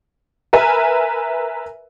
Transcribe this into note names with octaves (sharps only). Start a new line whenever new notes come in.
A#4 B4 E5 G#5